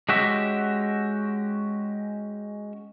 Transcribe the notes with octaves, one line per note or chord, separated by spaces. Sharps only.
G#3 C#4 F#4 G4 E5